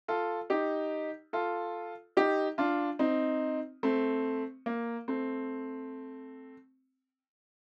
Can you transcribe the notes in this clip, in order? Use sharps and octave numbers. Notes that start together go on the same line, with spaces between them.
F4 A4
D#4 G4
F4 A4
D#4 G4
D4 F4
C4 D#4
A3 C4
A#3
A3 C4